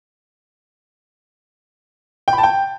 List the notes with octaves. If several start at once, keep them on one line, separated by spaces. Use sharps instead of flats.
G5
B5
A5
G5